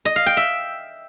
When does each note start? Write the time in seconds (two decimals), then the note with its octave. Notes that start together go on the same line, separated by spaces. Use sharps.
0.05 D#5
0.16 F5
0.26 G5
0.37 E5